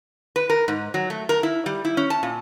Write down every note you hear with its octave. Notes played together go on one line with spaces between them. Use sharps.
B4
A#4
G#2
F#3
A3
A#4
E4
G3
E4
C#4
A5
A#2